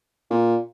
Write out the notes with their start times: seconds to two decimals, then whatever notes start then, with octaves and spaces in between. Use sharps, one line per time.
0.31 A#2